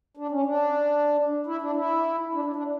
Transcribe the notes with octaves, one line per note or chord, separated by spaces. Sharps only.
D4
C#4
D4
E4
D4
E4
D4
D4
D4